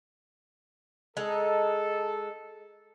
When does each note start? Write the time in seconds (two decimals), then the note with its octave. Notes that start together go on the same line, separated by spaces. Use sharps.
1.17 G#3 D#4 A4